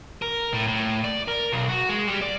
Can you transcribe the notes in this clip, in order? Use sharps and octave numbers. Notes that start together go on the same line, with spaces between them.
A#4
A2
A2
D5
A#4
B1
F#4
G#3
G3
D5